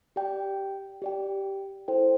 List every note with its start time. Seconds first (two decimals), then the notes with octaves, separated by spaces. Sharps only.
0.16 G4 D5 G5
1.02 G4 D5 G5
1.88 E4 A4 C5 G5